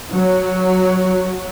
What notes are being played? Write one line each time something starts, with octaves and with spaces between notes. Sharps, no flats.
F#3